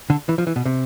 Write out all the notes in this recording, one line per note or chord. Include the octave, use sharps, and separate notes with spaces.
D3
E3
F3
E3
B2
C3